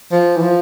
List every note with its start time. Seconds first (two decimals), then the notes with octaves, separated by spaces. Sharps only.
0.12 F3
0.36 E3
0.42 F3